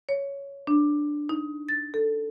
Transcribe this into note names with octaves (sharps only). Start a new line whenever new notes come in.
C#5
D4
D#4
A6
A4